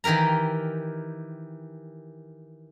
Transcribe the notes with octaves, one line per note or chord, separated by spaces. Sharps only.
D#3 E3 G4 A#4 A#5